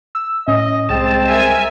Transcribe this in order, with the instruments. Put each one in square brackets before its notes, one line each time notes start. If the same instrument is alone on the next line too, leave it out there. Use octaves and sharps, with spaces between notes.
[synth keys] E6
[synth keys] A2 C#4 [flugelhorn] D#5
[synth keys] C2 G3 G5 [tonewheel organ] G#3 A5 [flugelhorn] C4
[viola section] A#4 E5 G#5